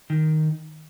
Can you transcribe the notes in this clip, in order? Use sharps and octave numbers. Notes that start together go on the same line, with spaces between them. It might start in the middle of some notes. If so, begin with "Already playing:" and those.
D#3